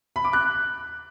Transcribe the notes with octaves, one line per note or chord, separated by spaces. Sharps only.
B5
D6
F#6